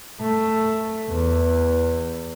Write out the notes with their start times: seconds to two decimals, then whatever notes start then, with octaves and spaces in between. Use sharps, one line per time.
0.21 A3
1.10 E2